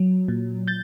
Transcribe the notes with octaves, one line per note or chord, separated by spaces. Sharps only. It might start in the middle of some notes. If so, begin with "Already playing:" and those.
Already playing: F#3
A#2
G6 A6